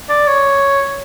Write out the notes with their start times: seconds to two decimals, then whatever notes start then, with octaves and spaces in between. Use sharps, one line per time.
0.09 D5
0.27 C#5